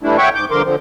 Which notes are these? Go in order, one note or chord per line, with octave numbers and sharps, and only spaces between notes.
E3 G3 A3 D4 E4
C#5 E5 F#5 G5 C#6
G#2 D6 G6
G2 D3 F3 A#4 C6 D6
D3 F3 C4